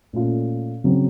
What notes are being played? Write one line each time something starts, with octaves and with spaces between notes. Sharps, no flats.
A#2 A3 C#4 F4 A4
C#3 F#3 C4